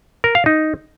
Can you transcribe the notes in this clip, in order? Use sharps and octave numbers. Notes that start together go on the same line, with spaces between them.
A#4
F5
D#4